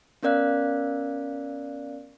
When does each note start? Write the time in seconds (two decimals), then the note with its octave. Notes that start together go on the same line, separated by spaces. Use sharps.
0.23 B3 C#4 A#4 D5 F5 F#6